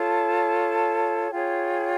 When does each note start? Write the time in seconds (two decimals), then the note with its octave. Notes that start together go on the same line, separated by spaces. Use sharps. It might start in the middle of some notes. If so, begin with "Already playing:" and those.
Already playing: F4 A4 C#5 A5
1.31 F4 G#4 C#5 G5